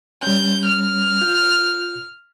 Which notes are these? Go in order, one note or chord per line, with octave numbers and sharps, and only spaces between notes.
G3 C#4 G6
F6
F4 G6